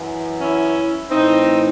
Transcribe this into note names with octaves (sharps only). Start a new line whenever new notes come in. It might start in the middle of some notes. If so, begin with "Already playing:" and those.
Already playing: F#2 E3
C#4 E4
A2 E3 C4 D#4